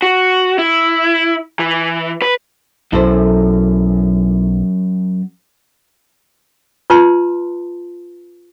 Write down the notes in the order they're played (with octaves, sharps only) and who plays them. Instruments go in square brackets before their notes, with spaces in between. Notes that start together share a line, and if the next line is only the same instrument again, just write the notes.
[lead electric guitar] F#4
E4
E3
B4
[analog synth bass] B1 [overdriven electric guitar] F#2 [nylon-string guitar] E4 A4 C5
[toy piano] F4 B4 A5 C6